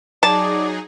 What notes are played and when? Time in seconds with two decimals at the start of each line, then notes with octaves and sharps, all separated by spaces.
0.23 F#3 D#4 G#4 D5 A5